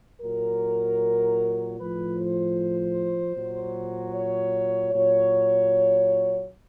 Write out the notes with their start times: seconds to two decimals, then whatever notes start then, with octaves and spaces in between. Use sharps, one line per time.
0.21 A#2 F#3 A#4
1.78 A2 F3 B4
2.17 C5
3.35 A#2 F#3
4.13 C#5
4.92 A#2 F#3 C#5